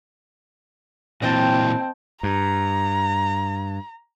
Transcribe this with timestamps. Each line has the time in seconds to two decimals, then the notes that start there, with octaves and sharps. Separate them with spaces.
1.22 A#2 E3 F#3 C4 D#5 G5 A5
2.23 G2 A#5